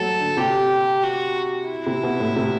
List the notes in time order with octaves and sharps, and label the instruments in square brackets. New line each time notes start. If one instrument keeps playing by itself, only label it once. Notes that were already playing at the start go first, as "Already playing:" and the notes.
Already playing: [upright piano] F#3 A3 [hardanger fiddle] A4
[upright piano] D3
[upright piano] C3 [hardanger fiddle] G4
[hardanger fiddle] F#4
E4
[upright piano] C3
B2
A2
C3